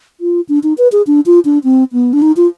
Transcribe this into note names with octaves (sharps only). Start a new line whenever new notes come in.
F4
D4
D#4
B4
G#4
D4
F4
D4
C4
B3
D4
D#4
F4